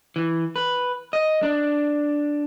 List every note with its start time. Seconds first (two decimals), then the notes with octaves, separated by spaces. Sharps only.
0.16 E3
0.56 B4
1.13 D#5
1.43 D4